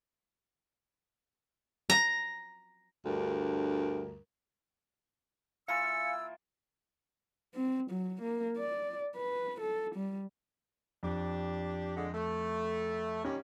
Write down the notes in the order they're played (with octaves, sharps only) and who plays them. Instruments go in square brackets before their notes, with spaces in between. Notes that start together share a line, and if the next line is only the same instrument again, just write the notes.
[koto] A#5
[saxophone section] D2 G2 A#4
[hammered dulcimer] E3 A#3 F4 [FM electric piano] F5 G#5 [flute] E6 [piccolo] C#7
[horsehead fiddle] C4
F#3
A#3
D5
B4
A4
G3
[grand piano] F2 [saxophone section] D4 G4
[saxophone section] D3 G#3
A3
[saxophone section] A#2 D#3 G3 [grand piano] C#4